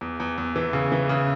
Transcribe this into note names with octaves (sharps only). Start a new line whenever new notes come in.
E2
E2
E2
E3
C#3
E3
C#3